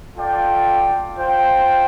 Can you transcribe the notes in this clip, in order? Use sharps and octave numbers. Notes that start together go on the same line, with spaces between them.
F4 A4 D5 G5
F4 C5 G5